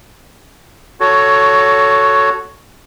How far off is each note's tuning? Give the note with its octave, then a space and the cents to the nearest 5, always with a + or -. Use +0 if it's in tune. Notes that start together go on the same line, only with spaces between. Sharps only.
F#4 +0 A4 +0 C#5 +15